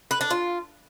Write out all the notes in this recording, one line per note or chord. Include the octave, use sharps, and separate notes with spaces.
B4
D4
F4